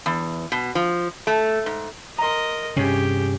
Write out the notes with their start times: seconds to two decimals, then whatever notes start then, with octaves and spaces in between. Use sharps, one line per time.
0.06 E2
0.52 B2
0.75 F3
1.27 A3
1.66 G#2
2.18 A#4 D#5 A#5 C6
2.76 G2 C3 C#4 G4 G#4